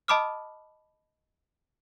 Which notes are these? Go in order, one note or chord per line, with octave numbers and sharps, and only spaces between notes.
D#5 A5 B5 D6 D#6 F6